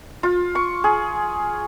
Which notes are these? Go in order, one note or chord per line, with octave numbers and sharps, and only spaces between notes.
F4
C#6
G#4